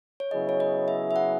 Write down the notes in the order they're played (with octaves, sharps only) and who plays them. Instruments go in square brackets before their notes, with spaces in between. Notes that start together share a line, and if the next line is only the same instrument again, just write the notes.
[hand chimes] C#5
[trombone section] C#3 F#3 B3 E4 G#4 [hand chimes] D#5
[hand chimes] C#5
D#5
E5
E5
F#5